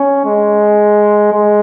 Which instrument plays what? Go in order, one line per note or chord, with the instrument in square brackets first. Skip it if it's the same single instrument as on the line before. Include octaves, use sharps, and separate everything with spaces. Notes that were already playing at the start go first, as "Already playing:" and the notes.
Already playing: [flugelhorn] C#4
G#3
G#3